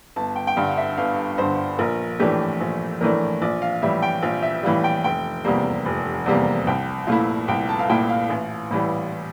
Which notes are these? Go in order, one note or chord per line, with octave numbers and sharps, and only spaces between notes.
G1 A5
G5
G5
G2 D3 F5
E5
G1 F5
G2 D3 C5
A#1 A#4
A2 E3 A3 D4 G4
A#1
A2 E3 A3 D4 A#4
A#1 D5
F5
A2 E3 G3 E5
G5
A#1 F5
E5
A2 E3 G3 F5
G5
F1 G5
E2 C3 G3 A#3
F1
E2 C3 G3 A#3
C2 G5
A#2 A3 E4 F5
C2 G5
A5
F5
A#2 A3 E4 G5
F5
A1
A2 E3 G3